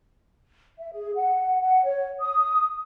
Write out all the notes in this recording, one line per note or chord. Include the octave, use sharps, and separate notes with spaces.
E5
G#4
F#5
F#5
C#5
D#6